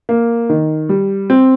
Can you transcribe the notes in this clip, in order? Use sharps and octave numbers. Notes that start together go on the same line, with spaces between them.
A#3
D#3
G3
C4